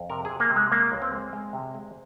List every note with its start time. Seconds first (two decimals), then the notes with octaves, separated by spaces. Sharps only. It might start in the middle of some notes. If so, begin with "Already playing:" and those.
Already playing: F2
0.10 C3 A#4
0.25 C3 G#4
0.40 A#3
0.50 C3
0.56 G#3
0.71 G#3 A#3
0.92 C#2
1.02 C4
1.12 G#3
1.33 G#3
1.53 C3
1.75 G#3